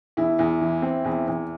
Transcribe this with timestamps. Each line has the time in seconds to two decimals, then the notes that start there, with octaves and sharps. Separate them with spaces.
0.17 E2 E4
0.39 E2
0.61 E3
0.82 C4
1.05 E2
1.28 E2